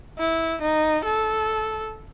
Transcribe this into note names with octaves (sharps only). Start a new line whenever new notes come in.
E4
D#4
A4